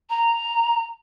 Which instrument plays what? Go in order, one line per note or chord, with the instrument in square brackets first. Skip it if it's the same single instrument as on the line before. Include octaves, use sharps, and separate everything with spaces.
[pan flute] A#5